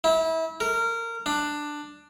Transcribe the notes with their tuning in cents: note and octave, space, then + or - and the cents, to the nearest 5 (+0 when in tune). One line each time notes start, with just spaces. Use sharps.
E4 -30
A#4 -20
D4 +10